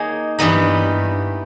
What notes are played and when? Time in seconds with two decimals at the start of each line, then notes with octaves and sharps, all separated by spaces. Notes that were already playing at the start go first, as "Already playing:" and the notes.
Already playing: A#3 D#4 G#4 C#5
0.39 G2 E3 G3 B3 D#4